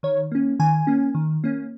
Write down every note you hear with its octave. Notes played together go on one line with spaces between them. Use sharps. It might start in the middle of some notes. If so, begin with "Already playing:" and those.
D#3 C#5
A#3 C#4
D#3 G#5
A#3 C#4
D#3
A#3 C#4